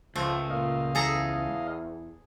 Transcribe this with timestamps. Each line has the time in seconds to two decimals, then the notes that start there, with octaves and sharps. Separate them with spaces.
0.16 C#2 F3 A3
0.50 A#2 D#5 F5
0.95 E2 G#4 A4 A#5